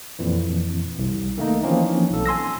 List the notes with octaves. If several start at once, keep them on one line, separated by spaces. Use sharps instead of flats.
F2 A#2 E3
C2
D#3 A3 A#3 D#4
E3 F3 A#3 C4 C#4 D#4
B1 A#2 A4
G#5 C6 E6 A#6